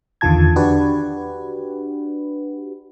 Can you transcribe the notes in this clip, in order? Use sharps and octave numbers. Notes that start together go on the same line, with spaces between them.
E2 D3 D#3 F4 A5 G#6
D4 F#4 G4 B4